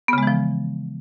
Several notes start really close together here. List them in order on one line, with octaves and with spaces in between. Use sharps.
B3 C#3 G#3 E3 F3